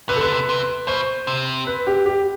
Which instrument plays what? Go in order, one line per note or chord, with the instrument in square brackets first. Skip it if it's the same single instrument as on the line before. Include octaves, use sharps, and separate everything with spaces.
[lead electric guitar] C3 [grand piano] B4
[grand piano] A4
[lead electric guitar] D3 [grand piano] B4
[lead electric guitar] C3
C3
[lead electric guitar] B2 [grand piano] C5
[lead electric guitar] C3
[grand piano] B4
G4
G4